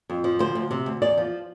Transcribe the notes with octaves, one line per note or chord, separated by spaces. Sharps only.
F2
F3
D2 C5
D2
C3
D2
E2 D5
F3